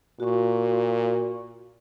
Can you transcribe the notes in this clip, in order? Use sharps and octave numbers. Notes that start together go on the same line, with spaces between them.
A#2 F#4 C#6